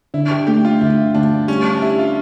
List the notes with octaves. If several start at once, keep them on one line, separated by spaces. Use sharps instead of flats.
D3 E4
G4
A3 G4
F4
D2 E4
D2 D4
G3 C#4
D4
E4 G4
F4